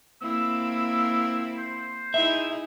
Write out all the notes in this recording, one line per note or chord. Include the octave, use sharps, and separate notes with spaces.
A#3 C4 E4 E6
C5
D#4 E4 G#4 E5